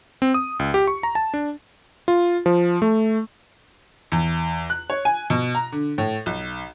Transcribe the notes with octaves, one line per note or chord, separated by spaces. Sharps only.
C4
D#6
C#2
G4
C#6
A#5
A5
D4
F4
F3
A3
E2
F#6
C#5
G#5
B2
A#5
D3
A2
B1